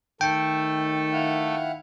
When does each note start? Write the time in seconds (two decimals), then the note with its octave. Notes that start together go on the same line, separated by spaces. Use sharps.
0.21 D#3 A3 A4 G5
1.13 E4 F5 F#5